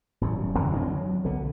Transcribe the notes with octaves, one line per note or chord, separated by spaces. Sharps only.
D#1 F#2 A2
E2 C#3
D3 F#3 C4
F#3
B1 D3 B3